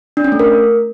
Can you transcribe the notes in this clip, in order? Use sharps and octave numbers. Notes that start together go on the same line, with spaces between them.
D4
C#4
A3
A#4